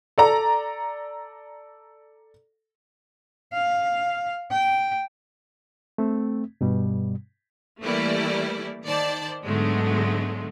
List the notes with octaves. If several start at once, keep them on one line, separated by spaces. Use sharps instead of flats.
A4 D5 A#5
F5
G5
A3 C4
G2 B2 G3
E3 G3 A3 A#3 E4 D5
D#3 C5 D5 A5
G#2 D3 F#3 G#3 A3 B3